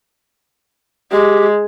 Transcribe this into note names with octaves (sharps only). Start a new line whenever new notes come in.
G#3 G4